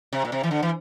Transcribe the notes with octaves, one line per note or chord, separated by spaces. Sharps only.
C3
A#2
C3
E3
D3
E3